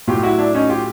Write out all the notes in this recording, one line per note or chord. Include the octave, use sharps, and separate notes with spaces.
A2 F#3 F4 G4
E4 F#4
D4 E4
C#4 D#4
F4 G4